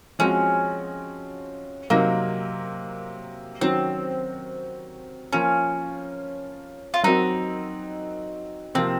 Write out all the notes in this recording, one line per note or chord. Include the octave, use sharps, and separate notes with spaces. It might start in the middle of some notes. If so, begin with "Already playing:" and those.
F3 G#3 C4 C#4 F#4
C3 F#3 A#3 C4 D#4 A#4
D#3 F#3 C4 C#4 F#4
F3 A#3 C#4 F4 A#4
F4
F#3 C4 D#4 F#4 A#4
C3 F3 A#3 C4 F4